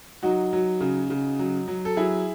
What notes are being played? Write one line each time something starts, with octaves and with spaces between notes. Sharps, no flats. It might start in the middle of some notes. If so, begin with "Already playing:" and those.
F#3 D#4 F#4
F#3
C#3
C#3
F#3
F#3
A4
F#3 E4 G#4